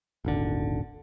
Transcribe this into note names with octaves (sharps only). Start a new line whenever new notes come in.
D#1 G#1 D3